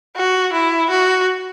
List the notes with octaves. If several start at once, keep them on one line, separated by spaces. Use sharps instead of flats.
F#4
E4
F#4